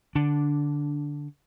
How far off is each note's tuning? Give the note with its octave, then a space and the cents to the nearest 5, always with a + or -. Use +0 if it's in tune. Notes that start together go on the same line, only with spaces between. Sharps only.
D3 +0 D4 -10